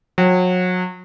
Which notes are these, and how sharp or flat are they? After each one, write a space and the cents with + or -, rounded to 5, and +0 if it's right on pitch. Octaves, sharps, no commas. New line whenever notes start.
F#3 -30 G5 -30